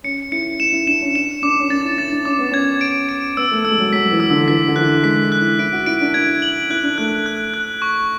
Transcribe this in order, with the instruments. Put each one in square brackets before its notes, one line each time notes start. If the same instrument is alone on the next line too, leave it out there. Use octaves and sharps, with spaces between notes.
[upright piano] C#4 [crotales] C#7
[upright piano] E4 [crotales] C#7
[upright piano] E4 [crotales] E7
[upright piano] E4
[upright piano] D4 [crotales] E7
[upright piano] C#4
[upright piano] D4 [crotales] E7
[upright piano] D4 [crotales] D6
[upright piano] C#4
[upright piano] D4 [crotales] A6
[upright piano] E4
[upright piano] E4 [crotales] A6
[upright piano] D4
[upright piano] C#4 [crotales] D6
[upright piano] B3
[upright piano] C#4 [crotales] G#6
[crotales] D7
D7
[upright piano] B3 [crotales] E6
[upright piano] A3
[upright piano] A3 [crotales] E6
[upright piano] G#3
F#3
[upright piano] F#3 [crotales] B6
[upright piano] E3
[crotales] E6
[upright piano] D3
[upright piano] E3 [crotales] B6
[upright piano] D3
[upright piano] E3 [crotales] F#6
[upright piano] G#3 [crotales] B6
[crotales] F#6
[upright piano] E4
[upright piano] E4 [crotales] D7
[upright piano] F#4
[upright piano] E4 [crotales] D7
[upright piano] D4
[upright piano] E4 [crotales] G#6
[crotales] F#7
[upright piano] E4 [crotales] F#6
[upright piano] D4
[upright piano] A3 [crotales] F#6
[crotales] F#6
F#6
C#6